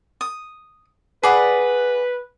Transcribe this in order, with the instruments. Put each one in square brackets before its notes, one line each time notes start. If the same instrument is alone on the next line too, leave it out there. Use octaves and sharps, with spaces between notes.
[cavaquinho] D#6
[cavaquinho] G#4 D5 F#5 [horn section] B4